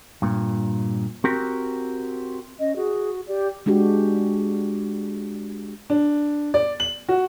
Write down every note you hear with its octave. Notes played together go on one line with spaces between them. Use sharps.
G2 A#2
C4 F#4 G4 A#4
C#4 D#5
F#4 G#4
G4 D5
G#3 D4 F#4 G4
D4
D5
F#7
F#4